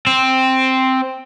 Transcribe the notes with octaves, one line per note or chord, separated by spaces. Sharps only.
C4